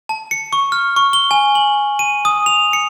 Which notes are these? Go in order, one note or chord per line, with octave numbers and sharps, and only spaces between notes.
A5
C#7
C#6
F6
C#6
G7
G#5
F#7
D#7
D#6
F7
C#7